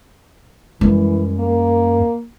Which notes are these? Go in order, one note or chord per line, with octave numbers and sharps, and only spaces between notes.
F#2 E3 G3 G#3
A#3